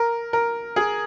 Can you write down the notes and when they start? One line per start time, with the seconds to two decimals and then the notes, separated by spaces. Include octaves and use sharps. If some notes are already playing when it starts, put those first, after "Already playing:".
Already playing: A#4
0.33 A#4
0.76 G#4